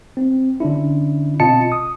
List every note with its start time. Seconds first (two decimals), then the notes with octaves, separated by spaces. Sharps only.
0.17 C4
0.60 D3 C#4 D4 E4
1.40 B2 C4 F4 D#5 A5 C#7
1.72 D#6